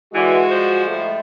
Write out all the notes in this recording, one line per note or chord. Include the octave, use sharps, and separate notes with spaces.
D3 E3 G#3 F#4
F3 G3 C5
A2 G#3 A3